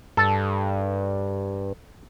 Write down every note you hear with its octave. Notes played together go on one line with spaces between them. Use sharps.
G2 A4